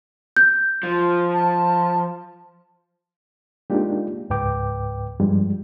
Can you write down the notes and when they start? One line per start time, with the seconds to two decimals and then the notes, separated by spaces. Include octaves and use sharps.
0.37 G6
0.83 F3 F4
1.32 A5
3.70 G#3 A#3 D4 D#4 F4 G4
4.30 C#2 G#2 B4 G5 D6
5.20 G2 F3 G3 G#3